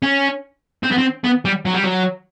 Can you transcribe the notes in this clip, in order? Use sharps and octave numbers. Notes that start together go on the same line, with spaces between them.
C#4
C4
B3
C4
B3
G3
F#3
G3
F#3